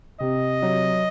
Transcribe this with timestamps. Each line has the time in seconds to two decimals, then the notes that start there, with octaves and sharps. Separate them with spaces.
0.20 C3 D#5
0.62 F#3